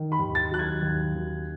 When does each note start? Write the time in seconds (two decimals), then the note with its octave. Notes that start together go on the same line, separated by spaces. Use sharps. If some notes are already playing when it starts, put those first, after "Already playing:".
Already playing: D#3
0.12 B5
0.19 D#2
0.35 A6
0.52 F#3 F#6
0.59 G#6
0.83 D#2
1.15 D#3